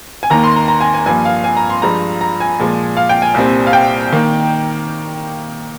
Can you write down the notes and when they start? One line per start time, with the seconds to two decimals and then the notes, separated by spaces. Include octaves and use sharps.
0.23 G#5
0.30 D#2 D#3 A#3 A#5
0.44 C6
0.56 A#5
0.68 A#5
0.81 G#5
0.94 G#5
1.06 G2 F3 A#3 G#5
1.25 F5
1.44 G#5
1.57 A#5
1.70 C6
1.82 G2 F3 G#3 A#5
2.21 A#5
2.40 G#5
2.59 A#2 F3 G#3
2.97 F5
3.09 G5
3.22 G#5
3.34 C2 A#2 G3 C4
3.67 F5
3.73 G5
4.12 D#3 A#3